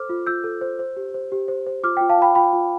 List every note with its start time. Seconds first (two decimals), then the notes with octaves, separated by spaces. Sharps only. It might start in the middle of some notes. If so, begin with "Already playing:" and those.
Already playing: A4 C5 D6 F6
0.09 F4
0.27 F4 E6 G6
0.44 A4
0.61 C5
0.79 C5
0.97 G4
1.14 C5
1.32 G4
1.48 C5
1.67 C5
1.83 F4 D6 F6
1.97 F4 G5
2.09 F5 A5
2.18 F4 G5 B5
2.35 F4 G5 B5
2.53 F4